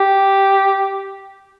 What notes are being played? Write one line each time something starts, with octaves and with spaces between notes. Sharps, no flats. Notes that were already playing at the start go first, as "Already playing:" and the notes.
Already playing: G4